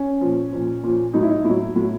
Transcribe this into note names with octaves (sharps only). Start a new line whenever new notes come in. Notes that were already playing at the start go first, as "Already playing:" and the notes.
Already playing: C#4
A#2 F3
A#2 F3
A#2 F3
A2 F#3 D#4
E4
D#4
A2 F#3 E4
A2 F#3